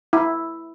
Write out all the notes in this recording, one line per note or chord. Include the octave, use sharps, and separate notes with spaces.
E4